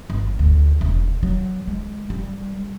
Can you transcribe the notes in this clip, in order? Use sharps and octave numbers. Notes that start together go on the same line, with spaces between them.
G1
D2
E1
F#3
G#3
G3